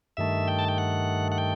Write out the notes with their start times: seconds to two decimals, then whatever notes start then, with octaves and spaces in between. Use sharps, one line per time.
0.17 G2 D#3 A3 E5
0.48 G5
0.59 A5
0.68 G5
0.78 F#5
1.32 F#5
1.38 G5